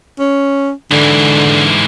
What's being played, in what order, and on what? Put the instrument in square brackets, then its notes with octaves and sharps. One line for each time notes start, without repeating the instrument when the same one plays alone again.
[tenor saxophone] C#4
[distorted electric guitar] G#2 E3 [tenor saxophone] D3